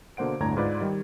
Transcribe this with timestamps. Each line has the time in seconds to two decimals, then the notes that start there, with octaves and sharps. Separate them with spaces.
0.17 B2 D3 A#3 C5 F#5 D7
0.40 G1 D2 A2 D3 A#5 G#6
0.57 G#2 F4 B4 D5
0.81 D#3 G3